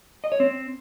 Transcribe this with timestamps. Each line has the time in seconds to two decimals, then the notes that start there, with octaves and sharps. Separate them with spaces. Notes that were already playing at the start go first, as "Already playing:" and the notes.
0.24 D#5
0.32 C#5
0.40 C4